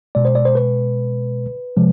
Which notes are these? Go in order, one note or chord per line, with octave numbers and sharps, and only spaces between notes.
B2 G#3 D5
C5
D5
C5
B4
C3 F3 G#3